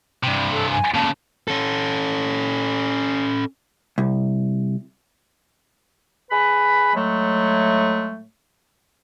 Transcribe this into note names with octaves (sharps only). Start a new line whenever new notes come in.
G2 C3
A4
G#5
A#2 C#3 A5
C#4 A4
C2
G#4 B4 B5
A2 F#3 G#3 A3